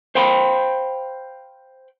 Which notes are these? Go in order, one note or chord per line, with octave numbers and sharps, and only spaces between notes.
C5 F5 G5 B5 C6